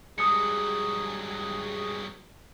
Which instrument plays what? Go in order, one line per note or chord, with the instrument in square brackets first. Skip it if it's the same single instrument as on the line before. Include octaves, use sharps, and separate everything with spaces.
[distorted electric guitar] G2 F#3 [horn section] G#3 G4 G#4 [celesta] D#6 C#7